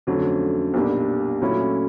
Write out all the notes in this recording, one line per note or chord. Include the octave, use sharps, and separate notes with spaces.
F2 D3 F#3 A3 C#4
B1 A#2 G3 A#3 D4
A#2 F#3 A3 C#4 E4